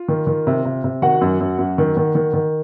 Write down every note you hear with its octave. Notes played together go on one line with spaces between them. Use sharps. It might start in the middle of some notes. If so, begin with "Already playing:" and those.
Already playing: F4
D#3
D#3
C3
C3
C3
D#3 F#4 F#5
F#2
F#2
F#2
D#3
D#3
D#3
D#3